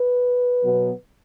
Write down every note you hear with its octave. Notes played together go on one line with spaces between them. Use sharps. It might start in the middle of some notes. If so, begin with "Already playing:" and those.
Already playing: B4
B2 F#3 B3